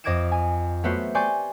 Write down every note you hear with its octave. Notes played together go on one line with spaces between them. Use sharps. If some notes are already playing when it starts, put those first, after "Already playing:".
F2 D#5 D6 G#6 D7 E7
G#5
F#3 A3 B3 F#4 C5
G4 D5 G#5 C6 C#6 G6